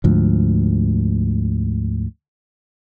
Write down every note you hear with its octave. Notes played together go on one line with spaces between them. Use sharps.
D2 G#2 F3